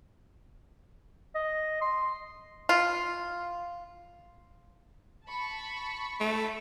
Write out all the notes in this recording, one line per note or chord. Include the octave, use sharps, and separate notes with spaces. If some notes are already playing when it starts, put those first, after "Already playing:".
D#5
C6
F4
A5 B5 C#6
A3